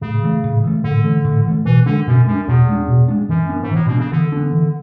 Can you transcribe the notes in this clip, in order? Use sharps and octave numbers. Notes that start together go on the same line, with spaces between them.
A2 C#3
E3 A3
A2
E3 A3
A2 D3
E3 A3
A2
E3 A3
B2 E3
D3 G#3 D4
F#2 B2
F#2 G#3 D4
E2 B2
G#3 D4
B2
G#3 D4
F#2 E3
B3 D4
G#2
A2 E3
B2 B3 D4
C#3
D3 E3
B3 D4
E3